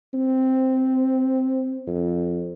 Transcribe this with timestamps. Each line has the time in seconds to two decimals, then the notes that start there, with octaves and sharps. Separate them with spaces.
0.14 C4
1.87 F2